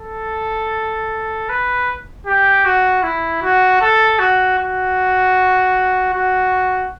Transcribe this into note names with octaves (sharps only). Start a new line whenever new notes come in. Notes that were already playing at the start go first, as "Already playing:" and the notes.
Already playing: A4
B4
G4
F#4
E4
F#4
A4
F#4
F#4
F#4